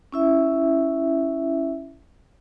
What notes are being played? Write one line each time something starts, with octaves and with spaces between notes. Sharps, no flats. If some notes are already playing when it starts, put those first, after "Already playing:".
C#4 E4 E5